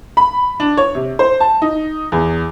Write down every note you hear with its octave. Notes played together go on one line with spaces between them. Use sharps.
B5
D4
C#5
C3
C5
A5
D#4
E2